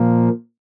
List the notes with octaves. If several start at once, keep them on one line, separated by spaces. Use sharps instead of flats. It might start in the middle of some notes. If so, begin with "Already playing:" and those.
Already playing: A#2 F3 A#3